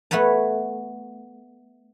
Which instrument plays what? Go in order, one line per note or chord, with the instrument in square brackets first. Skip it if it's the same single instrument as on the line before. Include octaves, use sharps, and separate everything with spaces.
[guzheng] A3 B3 B4 C#5 A5